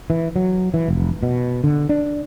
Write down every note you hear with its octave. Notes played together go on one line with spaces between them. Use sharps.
E3
F#3
E3
F1
B2
D3
D4